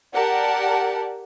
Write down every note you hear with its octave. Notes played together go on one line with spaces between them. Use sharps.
G4 A#4 D5 F#5 A5